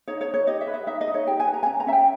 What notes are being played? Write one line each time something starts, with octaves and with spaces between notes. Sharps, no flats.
D#4 C#5
C#5
D#4
C#5
G4 D#5
E5
B4
E5
D#4 E5
D#5
D#4
C#5
G4 G5
G#5
B4
A#5
G#5
C#4 A#5
A#5
C#4 E5
G5